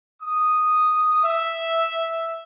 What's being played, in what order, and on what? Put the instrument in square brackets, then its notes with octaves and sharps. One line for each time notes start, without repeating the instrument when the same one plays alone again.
[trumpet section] D#6
E5